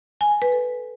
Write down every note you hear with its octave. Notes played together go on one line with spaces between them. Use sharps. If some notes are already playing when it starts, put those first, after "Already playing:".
G#5
G#5
B4
A4